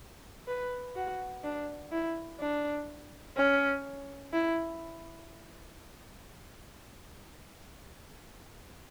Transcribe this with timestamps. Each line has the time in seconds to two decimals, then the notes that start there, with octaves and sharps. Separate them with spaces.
0.47 B4
0.95 F#4
1.44 D4
1.92 E4
2.40 D4
3.37 C#4
4.33 E4